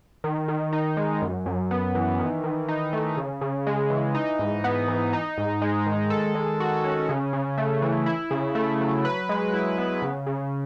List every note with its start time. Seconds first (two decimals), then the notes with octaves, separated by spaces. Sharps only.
0.24 D#3
0.48 D#3
0.73 D#4
0.97 G#3
1.22 F#2
1.46 F#2
1.71 B3
1.95 E3
2.19 D#3
2.44 D#3
2.68 D#4
2.93 A3
3.17 C#3
3.41 C#3
3.67 G#3
3.90 E3
4.15 D#4
4.39 G#2
4.64 B3
4.88 E3
5.13 D#4
5.38 G#2
5.62 G#3
5.86 D#3
6.10 A4
6.35 G#3
6.60 F#4
6.84 C#4
7.09 C#3
7.33 C#3
7.58 A3
7.82 E3
8.06 E4
8.31 C#3
8.55 A3
8.80 F#3
9.05 B4
9.29 G#3
9.53 E4
9.78 B3
10.02 C#3
10.27 C#3